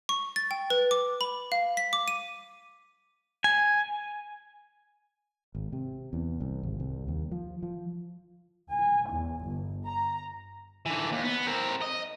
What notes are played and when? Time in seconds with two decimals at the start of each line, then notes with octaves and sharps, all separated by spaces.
0.09 C#6
0.36 A6
0.51 G5
0.70 B4
0.91 D6
1.21 B5
1.52 F5
1.77 B6
1.93 D6
2.08 D#7
3.44 G#5
5.55 G#1
5.72 C3
6.13 E2
6.40 C2
6.63 G#1
6.80 C2
7.08 D#2
7.32 F3
7.63 F3
8.70 G#5
9.12 E2
9.44 G1
9.86 A#5
10.86 D3 E3
11.12 D#2
11.23 B3
11.47 C4 A#4
11.82 D#5